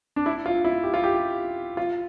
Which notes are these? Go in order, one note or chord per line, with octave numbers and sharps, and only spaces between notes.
D4
E4
F4
E4
G4
F4
G4
F4